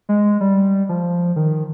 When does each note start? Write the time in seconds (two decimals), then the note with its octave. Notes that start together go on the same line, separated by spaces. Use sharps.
0.09 G#3
0.41 G3
0.89 F3
1.36 D#3